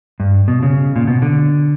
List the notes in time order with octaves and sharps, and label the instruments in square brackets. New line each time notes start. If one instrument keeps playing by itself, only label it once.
[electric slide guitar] G2
B2
C#3
A#2
B2
D3